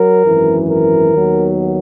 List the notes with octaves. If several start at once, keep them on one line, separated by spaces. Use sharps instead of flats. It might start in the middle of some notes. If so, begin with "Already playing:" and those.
Already playing: F#3 A#4
G#1 F#2 E3
A#4
D#2 D#3 F#3 B3